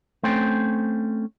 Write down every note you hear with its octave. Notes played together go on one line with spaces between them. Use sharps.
A3 C4 C#4 C5 G5